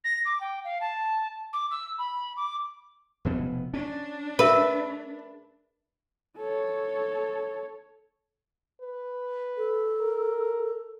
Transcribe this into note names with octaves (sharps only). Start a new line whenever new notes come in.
A#6
D6
G5
F5
A5
D6
E6
B5
D6
F1 B2 B3
C#4 D4
G#4 A#4 B4 E5
A4 C#5
B4
A4
A#4